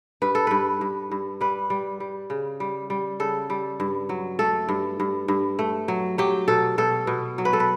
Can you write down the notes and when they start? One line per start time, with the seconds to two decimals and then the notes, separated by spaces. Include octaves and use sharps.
0.22 G2 B4
0.35 A4
0.47 G2 B4
0.81 G2
1.11 G2
1.41 G3 B4
1.70 G3
2.00 G3
2.30 C#3
2.60 G3
2.90 G3
3.20 C#3 A4
3.50 G3
3.80 G2
4.09 F#3
4.39 A3 A4
4.69 G2
5.00 G2
5.28 G2
5.59 A3
5.88 F#3
6.18 F#3 G4
6.48 B2 A4
6.78 B2 A4
7.07 B2
7.38 F#3
7.45 B4
7.53 A4
7.60 B4